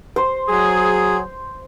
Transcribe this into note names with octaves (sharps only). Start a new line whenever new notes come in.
C5
F#3 G#4